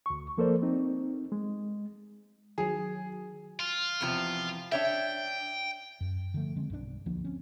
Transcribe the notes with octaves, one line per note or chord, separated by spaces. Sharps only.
D2 C#6
F3 A#3 A4 A#4 C5 D5
C4 D#4
G#3
D#3 F#3 G#4
F4
E2 C3 F3
D4 C#5 E5 G5
F#2
D3 F3 A3
D3 G#3 C4
B1 G2 E3 D4
D2 F3 A#3 D4
C4 C#4